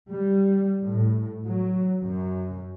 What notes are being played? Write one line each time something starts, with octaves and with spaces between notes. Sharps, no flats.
G3
A2
F#3
F#2